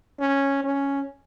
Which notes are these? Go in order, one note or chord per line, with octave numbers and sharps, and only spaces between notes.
C#4
C#4